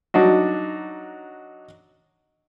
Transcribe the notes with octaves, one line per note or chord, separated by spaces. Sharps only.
F#3 D4 D#4 F#4